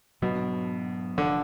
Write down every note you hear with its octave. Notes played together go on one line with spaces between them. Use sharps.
G#2 B2 F#3 B3 D4
F1 D3 F3